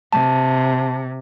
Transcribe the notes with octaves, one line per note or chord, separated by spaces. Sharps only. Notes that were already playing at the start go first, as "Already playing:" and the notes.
C3 A5